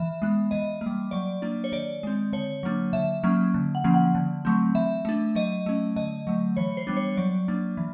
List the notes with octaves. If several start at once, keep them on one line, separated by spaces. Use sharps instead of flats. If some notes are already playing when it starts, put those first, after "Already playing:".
Already playing: E3 E5
G#3 B3
E3 D#5
A#3
G3
F#3 D5
A#3 D4
C#5
D#3 D5
G#3 C4
D3 C#5
F#3 A#3 D4
D3 E5
F#3 A#3 C#4
D3
F#5
F3 A#3 C#4
F#5
D3
F#3 A3 C4
E3 E5
A3 D4
F#3 D#5
A3 C#4
D3 D#5
F#3 A3
E3 C#5
C5
G3 B3 D4
C#5
F#3 D5
A#3 D4
E3